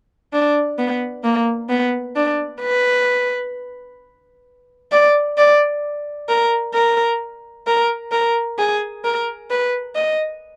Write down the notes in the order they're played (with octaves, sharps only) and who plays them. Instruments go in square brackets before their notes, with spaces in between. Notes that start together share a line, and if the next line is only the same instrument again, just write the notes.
[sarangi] D4
B3
A#3
B3
D4
B4
D5
D5
A#4
A#4
A#4
A#4
G#4
A#4
B4
D#5